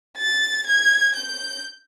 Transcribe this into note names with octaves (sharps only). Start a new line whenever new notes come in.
A6
G#6
G6